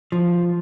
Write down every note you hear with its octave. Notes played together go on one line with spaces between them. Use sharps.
F3